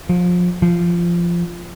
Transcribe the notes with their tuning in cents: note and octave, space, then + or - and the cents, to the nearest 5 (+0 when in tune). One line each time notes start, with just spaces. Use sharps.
F3 +25
F3 -15